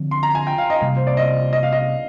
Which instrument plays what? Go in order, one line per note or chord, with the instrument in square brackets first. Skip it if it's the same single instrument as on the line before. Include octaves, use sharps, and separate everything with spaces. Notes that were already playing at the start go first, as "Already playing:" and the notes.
Already playing: [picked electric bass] D3 F3 C4
[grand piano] C6
A#5
G#5
G5
F5
D#5
[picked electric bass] C3 G3 A#3 [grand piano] F5
[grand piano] C5
D5
D#5
D#5
F5
D#5